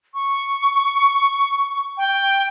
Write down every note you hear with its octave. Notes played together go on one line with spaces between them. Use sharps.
C#6
G5